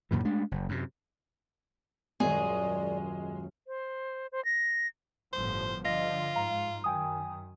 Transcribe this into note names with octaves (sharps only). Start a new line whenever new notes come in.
F#2 A#2 C#3 E3
G#3 A3 D4
F#1
F#2 C3
D#1 F#2 G#3 G#4 D5
C5
C5
A#6
G1 A2 F3 C5
D3 F3 F4 D#5 A#6
G#2 F5 A#5
F#2 D#3 G5 G#5 D#6